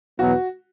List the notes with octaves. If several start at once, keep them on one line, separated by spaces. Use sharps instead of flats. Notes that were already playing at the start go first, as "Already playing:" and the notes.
E2 B2 F#3 B3 F#4